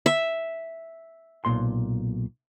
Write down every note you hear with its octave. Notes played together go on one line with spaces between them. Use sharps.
E5
B1 A#2 C6